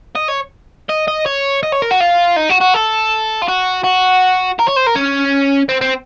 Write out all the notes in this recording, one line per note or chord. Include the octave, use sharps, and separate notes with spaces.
D#5
C#5
D#5
D#5
C#5
D#5
C#5
A#4
F#4
F4
D#4
F#4
F#4
A4
F4
F#4
F#4
A#4
C#5
C5
A#4
C#4
C4
C4